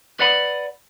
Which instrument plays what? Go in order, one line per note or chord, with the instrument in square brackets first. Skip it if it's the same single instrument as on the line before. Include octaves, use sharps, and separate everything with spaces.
[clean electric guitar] B4 D5 F#5 B5